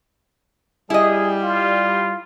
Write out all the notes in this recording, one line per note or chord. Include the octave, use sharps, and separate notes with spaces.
G3 E4 G#4 D#5
F4